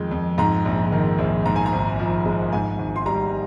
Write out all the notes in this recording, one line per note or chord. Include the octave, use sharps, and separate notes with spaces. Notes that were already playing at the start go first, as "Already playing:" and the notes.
Already playing: F2 D#3 G#3
F2
G#2 A#5
A#1
D#3
A#1
G#2 A#5
G#5
A#5
G#1
F3
G#3
G#2 G#5
G#1
C6
G3 A#5